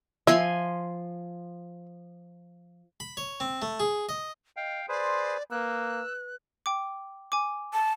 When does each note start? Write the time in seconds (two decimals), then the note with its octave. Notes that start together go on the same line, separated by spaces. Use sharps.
0.27 F3 E5 G#5 C6
3.00 B5
3.17 C#5
3.40 C4
3.62 A3
3.80 G#4
4.09 D#5
4.57 D#5 F5 G5
4.89 G#4 B4 C5 D5 C6
5.51 A#3 B4 E6 F#6
6.66 G5 D6
7.32 G#5 D6
7.73 A5